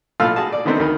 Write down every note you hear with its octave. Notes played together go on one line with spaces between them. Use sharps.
B1 A2 F4 A4 F5 E6
F#4 G#4 A5
D5
D3 D#3 A3 B3 C4 D#4
D2 D#3 A#4 B5